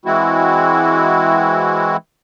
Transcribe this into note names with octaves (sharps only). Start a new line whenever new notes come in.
E3 G#3 C4 E4 F#4